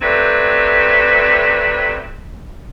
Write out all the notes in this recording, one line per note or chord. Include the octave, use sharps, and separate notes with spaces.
F#3 G3 A3 C4 B4